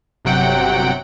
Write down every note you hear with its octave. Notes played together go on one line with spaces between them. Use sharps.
G1 C3 F#3 F#5 G5 D7